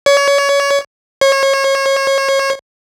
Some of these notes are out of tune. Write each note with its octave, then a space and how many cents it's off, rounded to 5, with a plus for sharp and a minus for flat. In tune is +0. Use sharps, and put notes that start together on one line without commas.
C#5 +25
C#5 -30